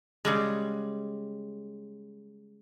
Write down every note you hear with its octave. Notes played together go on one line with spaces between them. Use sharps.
C#3 G3 G#3